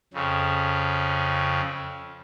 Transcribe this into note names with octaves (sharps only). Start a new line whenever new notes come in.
F2 C#3